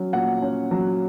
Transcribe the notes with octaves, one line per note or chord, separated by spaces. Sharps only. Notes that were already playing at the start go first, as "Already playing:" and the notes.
Already playing: F#3 C#4
A#2 F#5
C#4
F#3